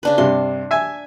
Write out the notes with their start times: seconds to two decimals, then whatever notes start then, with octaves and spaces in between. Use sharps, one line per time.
0.03 C#3 D4 B4
0.18 G2 C3 C6
0.71 E5 G#5